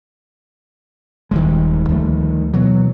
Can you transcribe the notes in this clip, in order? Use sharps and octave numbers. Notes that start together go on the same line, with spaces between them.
D#1 D#3 G3 G#3
D2 F3 A3
B2 E3 F#3 B3